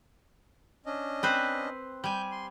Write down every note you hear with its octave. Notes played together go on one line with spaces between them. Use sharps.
C#4 D4 D#5
C4 B4 C5
G3 G#5 G6
C6